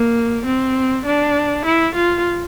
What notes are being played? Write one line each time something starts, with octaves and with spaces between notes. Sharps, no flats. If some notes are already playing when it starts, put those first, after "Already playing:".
Already playing: A#3
C4
D4
E4
F4